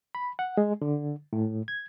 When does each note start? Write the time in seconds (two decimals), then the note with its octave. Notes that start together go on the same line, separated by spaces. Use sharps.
0.15 B5
0.39 F#5
0.57 G#3
0.82 D3
1.33 A2
1.68 G#6